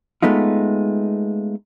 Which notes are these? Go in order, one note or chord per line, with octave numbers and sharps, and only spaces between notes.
G#3 A3 B3 D#4 F4